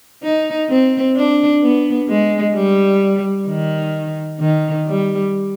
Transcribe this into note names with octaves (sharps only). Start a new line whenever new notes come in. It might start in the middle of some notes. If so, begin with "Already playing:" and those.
D#4
C4
D4
B3
G#3
G3
D#3
D#3
G3